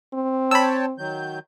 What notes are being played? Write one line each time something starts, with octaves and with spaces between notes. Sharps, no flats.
C4
C#5 G5 A5 B5 E6
D#3 F#3 G6